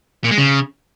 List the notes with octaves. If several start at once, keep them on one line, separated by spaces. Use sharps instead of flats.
A#2
G#3
C#3